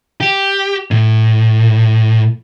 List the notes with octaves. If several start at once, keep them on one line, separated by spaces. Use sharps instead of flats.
G4
A2